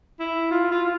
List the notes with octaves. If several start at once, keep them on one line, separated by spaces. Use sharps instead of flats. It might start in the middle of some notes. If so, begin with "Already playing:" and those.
E4
F4
F4